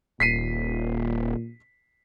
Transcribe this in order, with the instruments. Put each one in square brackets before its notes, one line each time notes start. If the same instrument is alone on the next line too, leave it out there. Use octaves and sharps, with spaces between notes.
[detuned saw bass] D#1 [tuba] A#2 [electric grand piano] B6 C7 D#7